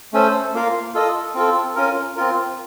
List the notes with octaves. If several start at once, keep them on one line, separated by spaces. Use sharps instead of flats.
A3 C#4 A4 C5
A#3 F4 A#4 F5
F4 A4 D#5
C4 F4 A4
C#4 F4 A#4
C4 F4 A#4